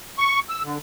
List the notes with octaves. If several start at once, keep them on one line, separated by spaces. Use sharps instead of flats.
C#6
E6
D3